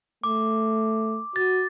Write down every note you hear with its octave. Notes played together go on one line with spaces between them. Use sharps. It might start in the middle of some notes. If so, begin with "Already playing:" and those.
A3 D6
F#4 A6